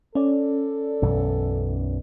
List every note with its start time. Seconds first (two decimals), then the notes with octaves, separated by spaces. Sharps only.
0.15 C#4 A4 D5
1.02 B1 F#2 E3